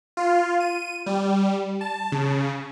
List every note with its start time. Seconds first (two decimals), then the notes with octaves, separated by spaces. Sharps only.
0.17 F4
0.60 D#7
1.06 G3
1.81 A5
2.12 C#3